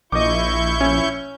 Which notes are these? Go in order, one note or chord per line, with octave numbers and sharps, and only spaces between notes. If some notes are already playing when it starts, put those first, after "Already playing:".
A#1 E4 D#5 C#6 D6 G6
C#4